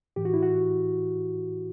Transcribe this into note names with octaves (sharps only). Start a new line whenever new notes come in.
A2 E3 G4
F#4
E4
F#4